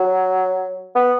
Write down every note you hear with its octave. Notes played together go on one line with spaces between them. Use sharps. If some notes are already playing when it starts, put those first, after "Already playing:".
Already playing: F#3
B3